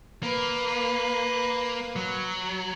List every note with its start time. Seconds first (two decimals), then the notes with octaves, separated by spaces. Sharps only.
0.23 A#3 B4
1.96 F#3